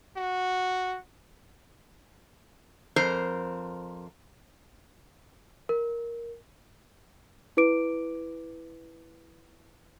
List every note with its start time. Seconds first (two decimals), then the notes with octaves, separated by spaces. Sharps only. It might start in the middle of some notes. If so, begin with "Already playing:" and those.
0.17 F#4
2.96 F2 A#4 C5 A#5
5.69 A#4
7.57 E4 B4 D6 D7